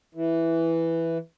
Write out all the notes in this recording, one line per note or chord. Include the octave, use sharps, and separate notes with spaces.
E3